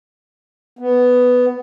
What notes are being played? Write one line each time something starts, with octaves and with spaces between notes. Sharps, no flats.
B3